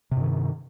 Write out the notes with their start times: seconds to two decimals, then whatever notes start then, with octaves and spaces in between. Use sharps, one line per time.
0.11 C3
0.16 G2
0.21 D#3